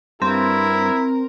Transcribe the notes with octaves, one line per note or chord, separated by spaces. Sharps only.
G2 C4 E4 A#4